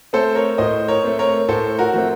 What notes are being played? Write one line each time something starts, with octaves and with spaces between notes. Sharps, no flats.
A3 C4 A4 C5
A#4 C#5
A2 C5 D#5
A#4 C#5
A3 C4
A#4 C#5
A2 A4 C5
F#4 A#4
F3 A3 C4